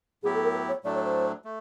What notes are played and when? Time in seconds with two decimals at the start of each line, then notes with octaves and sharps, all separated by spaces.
0.23 A2 F#3 B3 E4 G4 G#4
0.34 A4
0.43 A#4
0.54 B4
0.68 C#5
0.84 A2 F#3 A3 D4 D5
0.94 C#5
1.04 C5
1.44 A3